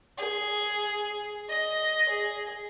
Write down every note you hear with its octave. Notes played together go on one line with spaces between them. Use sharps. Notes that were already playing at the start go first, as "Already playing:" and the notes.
G#4
D#5
G#4